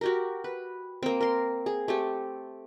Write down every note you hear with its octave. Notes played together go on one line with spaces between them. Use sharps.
F#4 G4 A#4
B4
A#3 C4
A#4 C6
G#4
A3 C4 G4